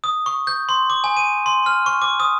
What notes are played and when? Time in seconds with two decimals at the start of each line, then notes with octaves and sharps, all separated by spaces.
0.04 D#6
0.26 C#6
0.47 G6
0.69 C6
0.90 D6
1.04 G#5
1.17 D#7
1.46 C6
1.66 F6
1.86 C#6
2.02 D6
2.20 D#6